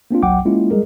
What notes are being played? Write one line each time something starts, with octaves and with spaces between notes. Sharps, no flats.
A#3 C4 D4 F4
G1 C2 F#3 F#5 G5 D6
G#3 A#3 C#4 E4 F4
G3 G#3 G#4 A#4